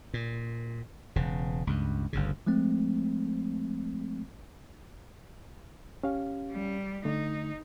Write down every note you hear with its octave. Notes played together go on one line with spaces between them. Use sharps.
A#2
E1 C#3
C#2 G2
G1 D2 C#3
F3 G#3 A3 C4
C#4 G4 F5
G3
D3 A3 D#4